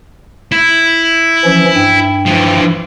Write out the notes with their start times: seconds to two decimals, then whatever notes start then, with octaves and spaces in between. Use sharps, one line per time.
0.52 E4
1.45 E3 F3 C#4
1.75 G2 G5
2.26 E3 F3